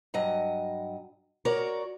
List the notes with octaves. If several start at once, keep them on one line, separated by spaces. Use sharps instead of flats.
G2 F#3 D#5
F#4 A#4 C#5 D5